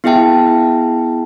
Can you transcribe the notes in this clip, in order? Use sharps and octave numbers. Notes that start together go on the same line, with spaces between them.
B3 E4 G#4 E5 G5 A5